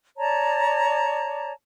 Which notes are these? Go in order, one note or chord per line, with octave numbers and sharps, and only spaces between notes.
C#5 D5 A5 A#5